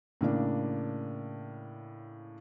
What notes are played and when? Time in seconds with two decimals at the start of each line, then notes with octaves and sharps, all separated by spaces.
0.21 A2 C#3 A#3 D4